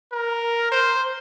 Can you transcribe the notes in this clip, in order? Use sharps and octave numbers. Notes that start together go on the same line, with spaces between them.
A#4
C5